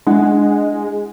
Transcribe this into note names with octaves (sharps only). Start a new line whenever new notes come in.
G#3 D4 E4 F#5